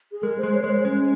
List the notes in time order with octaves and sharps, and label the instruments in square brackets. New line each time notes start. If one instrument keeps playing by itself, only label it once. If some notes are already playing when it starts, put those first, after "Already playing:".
[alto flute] G#4
[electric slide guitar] G#3 [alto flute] A#4
[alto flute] C5
[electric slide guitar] G#3
[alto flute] C#5
[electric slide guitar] G#3 [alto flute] C#5
[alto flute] C5
[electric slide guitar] G#3 [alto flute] C#4